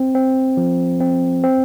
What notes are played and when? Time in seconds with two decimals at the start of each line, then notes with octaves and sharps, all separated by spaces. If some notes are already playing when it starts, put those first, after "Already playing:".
Already playing: C4
0.15 C4
0.57 F3
1.00 C4
1.44 C4